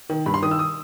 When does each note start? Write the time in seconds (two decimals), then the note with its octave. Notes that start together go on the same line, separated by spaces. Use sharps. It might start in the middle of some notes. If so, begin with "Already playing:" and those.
0.10 D#3
0.26 G2 B5
0.34 C6
0.42 D#3 D#6
0.51 E6
0.59 D#6